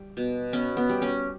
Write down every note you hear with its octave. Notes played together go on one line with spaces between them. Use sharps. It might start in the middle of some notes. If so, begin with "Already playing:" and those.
Already playing: G3
B2
B3 C#4
B3
G3
C#4